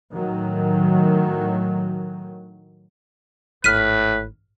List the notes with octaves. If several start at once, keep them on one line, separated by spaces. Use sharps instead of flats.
A2 D#3 F#3
G#1 A2 B4 F6 B6 D#7